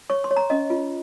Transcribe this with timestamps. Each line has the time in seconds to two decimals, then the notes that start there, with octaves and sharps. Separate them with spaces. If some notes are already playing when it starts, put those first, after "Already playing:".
0.10 C#5 C#6
0.24 C6
0.31 C#5
0.36 A#5
0.50 C#4 D#5
0.70 F4